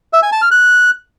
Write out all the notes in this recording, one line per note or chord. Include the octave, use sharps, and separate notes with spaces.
E5
G#5
A5
F6
F#6